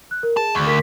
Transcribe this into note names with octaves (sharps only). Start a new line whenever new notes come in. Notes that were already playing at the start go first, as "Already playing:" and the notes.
F#6
A#4
G#4 A5
D2
A#4 B6